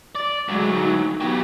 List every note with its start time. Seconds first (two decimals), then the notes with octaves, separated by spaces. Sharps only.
0.15 D5
0.49 D2 F#3 G#3
0.75 D#4
1.21 F#3 B3 G4